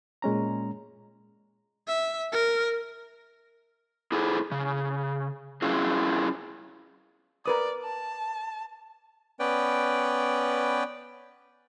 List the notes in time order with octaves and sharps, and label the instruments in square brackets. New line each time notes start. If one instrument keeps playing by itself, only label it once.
[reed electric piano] A#2 G#3 C#4 A#5
[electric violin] E5
A#4
[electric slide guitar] E4 G#4 A4
C#3
C#4 E4 F4 G#4
[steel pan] A#4 B4 D#6 [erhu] D5
[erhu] A5
[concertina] B3 C#4 B4 D5 G5